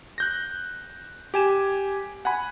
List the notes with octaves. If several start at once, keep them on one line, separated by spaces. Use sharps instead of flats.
F#6 G6 A#6
G4 G#5 E7
F#5 G#5 B5